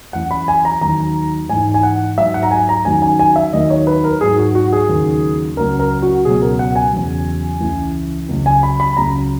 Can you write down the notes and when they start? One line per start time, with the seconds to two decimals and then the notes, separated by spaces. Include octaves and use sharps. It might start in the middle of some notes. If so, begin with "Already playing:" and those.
0.13 F#2 E3 F#5
0.31 B5
0.48 G#5
0.65 A#5
0.81 D#2 D#3 F#3 A#5
1.49 G#2 E3 G#5
1.74 G#5
1.83 F#5
2.18 G#2 F#3 E5
2.34 F#5
2.43 A#5
2.51 G#5
2.69 A#5
2.85 F#2 D#3 F#3 G#5
3.02 G#5
3.19 G#5
3.36 E5
3.53 D#2 D#3 F#3 D#5
3.70 C#5
3.87 B4
4.04 A#4
4.21 G#2 F#3 G#4
4.38 F#4
4.55 F#4
4.73 G#4
4.89 D#2 C#3 F#3
5.57 C#2 C#3 F#3 A#4
5.80 A#4
6.02 F#4
6.25 C#2 B2 F#3 G#4
6.42 A#4
6.59 F#5
6.76 G#5
6.93 E2 C#3 F#3
7.60 C#2 C#3 E3
8.29 C#2 C#3 F#3
8.46 G#5
8.63 B5
8.80 B5
8.97 C#2 C#3 F#3 A#5